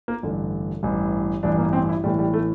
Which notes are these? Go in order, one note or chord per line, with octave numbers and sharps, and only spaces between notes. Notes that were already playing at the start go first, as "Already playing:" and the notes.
A#3
A1 G2 D3
A1 G2 E3
A1 G2 E3 D4
A#3
C4
E4
A1 A2 E3 G3
G3
A3